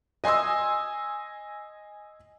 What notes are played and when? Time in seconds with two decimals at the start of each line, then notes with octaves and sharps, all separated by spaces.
0.24 D#5 G#5 C6 D#6 E6